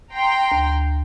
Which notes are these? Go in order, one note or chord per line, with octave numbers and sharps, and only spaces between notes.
G5 A#5 C6
D2